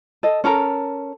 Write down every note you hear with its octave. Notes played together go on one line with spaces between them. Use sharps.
A4 D#5
C#4 A4 A#4 A#5